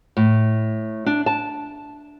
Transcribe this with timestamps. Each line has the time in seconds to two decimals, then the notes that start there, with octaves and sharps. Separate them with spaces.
0.17 A2
1.06 D4
1.26 A5